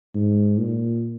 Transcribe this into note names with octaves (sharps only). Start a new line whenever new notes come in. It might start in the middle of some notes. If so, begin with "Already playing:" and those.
G#2
A#2